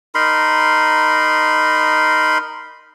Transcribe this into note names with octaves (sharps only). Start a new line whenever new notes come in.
D#4 A#4 B5 C6